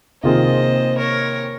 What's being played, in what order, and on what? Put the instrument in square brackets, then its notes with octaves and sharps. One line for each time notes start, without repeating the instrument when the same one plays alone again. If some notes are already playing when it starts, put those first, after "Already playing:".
[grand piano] C3 D#3 A#3 F4 G#4 [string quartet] C5 D#5
[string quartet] A#4 C#5